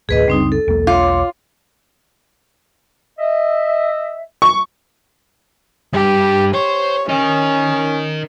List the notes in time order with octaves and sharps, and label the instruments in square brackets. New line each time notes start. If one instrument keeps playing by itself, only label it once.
[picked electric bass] A1 D2 A2 [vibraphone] G#4 B4 D#5
[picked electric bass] F#1 C#2 D4 [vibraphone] G3 C4 D#4
[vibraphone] A4
[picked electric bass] B1 E2 A#3
[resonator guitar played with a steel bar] F4 [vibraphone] C#5 C6 D6
[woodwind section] D#5 E5
[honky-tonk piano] C#6
[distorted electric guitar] G2 [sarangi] G4
[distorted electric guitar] C5 [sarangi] C#5
[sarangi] C#4 [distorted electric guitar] A#4 D#5